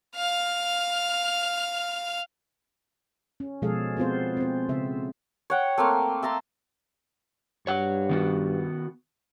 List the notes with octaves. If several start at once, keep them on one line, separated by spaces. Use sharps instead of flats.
F5 F6
C#4
B2 F3 G#3 G#4 A4 F5
B3 C4 F4 C5
C4 C5
C#3 E5
C#5 F#5 G5
A3 A#3 C4 F5
E5 A5 A#5 C6
G2 C#5 F#5
D#3 B3 F#4